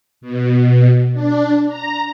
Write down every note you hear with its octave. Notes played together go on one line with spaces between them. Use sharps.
B2
D4
A#5